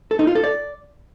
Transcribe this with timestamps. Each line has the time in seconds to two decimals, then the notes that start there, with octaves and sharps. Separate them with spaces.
0.11 A4
0.19 D#4
0.27 F4
0.35 A4
0.44 D5